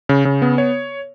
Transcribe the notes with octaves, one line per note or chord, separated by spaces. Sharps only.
C#3
C#3
B3
C#5